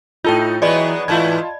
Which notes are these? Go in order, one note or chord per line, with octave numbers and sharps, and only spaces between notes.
A2 D#4 F4 A4 G5 G6
E3 F#3 G#3 B3 G#4 D5 D#5 B5
G#2 E3 A3 E4 F4 A5 G#6